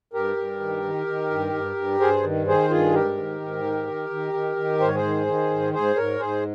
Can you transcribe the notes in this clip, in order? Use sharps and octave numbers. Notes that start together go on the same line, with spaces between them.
G2 G4 A#4
G2
D#3
D#3
D#3
G2
G2
G2
G2 G#4 C5
D#3
D#3 G#4 C5
G2 F4 G#4
G#2 G4 A#4
D#3
G#2
D#3
D#3
D#3
D#3
D#3
G#2 C5
C#5
G#4 C5
D#3
D#3
G#2
G#2 G#4 C5
G#2 A#4 C#5
G#2 G#4 C5